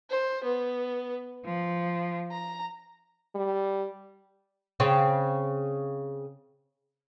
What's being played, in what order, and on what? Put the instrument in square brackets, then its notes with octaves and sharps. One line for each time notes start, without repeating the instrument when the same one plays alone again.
[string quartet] C5
B3
F3
A#5
[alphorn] G3
[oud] C#3 C4